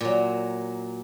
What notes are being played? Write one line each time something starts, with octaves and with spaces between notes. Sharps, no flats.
A#2 F#3